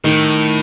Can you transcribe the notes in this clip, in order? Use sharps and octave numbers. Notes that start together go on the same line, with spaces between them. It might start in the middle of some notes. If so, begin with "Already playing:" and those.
A2 D#3